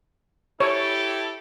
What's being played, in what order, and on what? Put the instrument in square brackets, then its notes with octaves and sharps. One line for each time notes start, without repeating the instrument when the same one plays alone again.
[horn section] E4 G4 A4 [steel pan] C#5